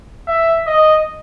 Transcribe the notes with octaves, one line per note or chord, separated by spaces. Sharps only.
E5
D#5